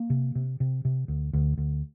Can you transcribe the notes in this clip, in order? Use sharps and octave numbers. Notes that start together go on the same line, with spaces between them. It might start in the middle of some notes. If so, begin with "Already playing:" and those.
Already playing: A#3
C3
C3
C3
C3
D2
D2
D2